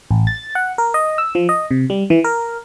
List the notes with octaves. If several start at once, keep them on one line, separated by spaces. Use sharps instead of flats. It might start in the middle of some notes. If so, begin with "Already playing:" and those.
A1
A6
F#5
A#4
D#5
E6
F3
D#5
C3
G3
E3
A#4